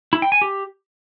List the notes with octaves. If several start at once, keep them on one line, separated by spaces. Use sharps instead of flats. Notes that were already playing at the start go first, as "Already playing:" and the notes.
E4
G5
G#5
G4